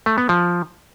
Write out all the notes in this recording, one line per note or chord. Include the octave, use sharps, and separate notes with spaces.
A3
B3
F3